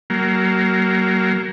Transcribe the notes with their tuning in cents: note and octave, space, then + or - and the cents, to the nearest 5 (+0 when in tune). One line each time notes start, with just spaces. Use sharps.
F#3 +30 A#3 +0